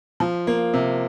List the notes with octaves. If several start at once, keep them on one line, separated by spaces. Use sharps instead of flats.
F3
A#3
C3